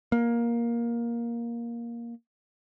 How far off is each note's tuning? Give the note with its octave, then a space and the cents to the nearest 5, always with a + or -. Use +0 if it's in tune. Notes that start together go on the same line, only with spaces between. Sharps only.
A#3 +10